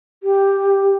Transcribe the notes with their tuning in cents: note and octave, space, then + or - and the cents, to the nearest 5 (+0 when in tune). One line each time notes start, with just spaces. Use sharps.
G4 +5